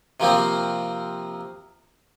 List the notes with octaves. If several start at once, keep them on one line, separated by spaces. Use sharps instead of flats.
C3 F3 A#3 C4